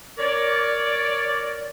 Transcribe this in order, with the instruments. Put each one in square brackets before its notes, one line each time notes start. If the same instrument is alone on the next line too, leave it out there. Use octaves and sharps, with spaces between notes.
[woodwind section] A#4 C#5 D5